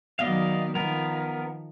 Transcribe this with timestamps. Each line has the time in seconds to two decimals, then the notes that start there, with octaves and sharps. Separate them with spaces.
0.19 D#3 F#3 B3 D5 D#5 F5
0.75 D#3 F3 B3 A#4